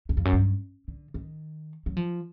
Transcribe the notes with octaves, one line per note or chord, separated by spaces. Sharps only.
E2
F2
F#2
G2
D3
D#3
F#3
F3